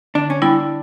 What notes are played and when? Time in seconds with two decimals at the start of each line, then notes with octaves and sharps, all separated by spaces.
0.15 D3 D4
0.30 C#4
0.42 G3 B3 D4 E4